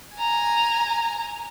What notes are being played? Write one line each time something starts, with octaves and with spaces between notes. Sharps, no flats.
G#5 A#5